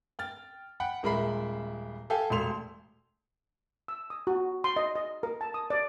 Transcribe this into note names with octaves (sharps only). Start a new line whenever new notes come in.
G5 F6 A6
F#5 G5 B5
D#1 G#3 A#4 E5 B5 C7
G4 A4 F5 G#5
E1 A3 C6 F7
E6
D#6
F#4
C6
D#5
D#5
A#4
A5
D#6
D5